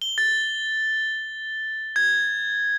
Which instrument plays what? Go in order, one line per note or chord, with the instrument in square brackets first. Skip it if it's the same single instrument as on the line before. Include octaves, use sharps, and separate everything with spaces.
[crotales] G7
A6
G#6